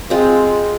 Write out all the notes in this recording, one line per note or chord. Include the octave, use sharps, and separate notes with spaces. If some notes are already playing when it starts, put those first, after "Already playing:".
G#3 C4 F4